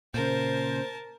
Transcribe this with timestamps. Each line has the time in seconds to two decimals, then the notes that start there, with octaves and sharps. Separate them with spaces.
0.14 A#2 C#3 A#4 C5 A5